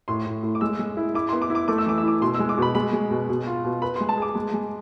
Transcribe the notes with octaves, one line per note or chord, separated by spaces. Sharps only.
A2 C6
A2
A2
D6
G#3 E6
G#3
E4
E4 D6
B3 C6
D6
E4
D6
A3 D6
E6
E3 D6
E6
E4 D6
B2 C6
G#3 E6
D6
B2 B5
G#3 B5
G#3
B2
B2
F4
B2
B4 B5
G#3 C6
A5
G#4 D6
G#3
G#3